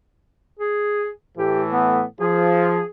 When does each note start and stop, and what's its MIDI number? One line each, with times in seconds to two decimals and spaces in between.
0.59 1.09 68
1.38 2.05 45
1.38 2.05 52
1.38 2.05 57
1.38 1.62 67
1.71 2.03 59
2.20 2.80 53
2.20 2.86 68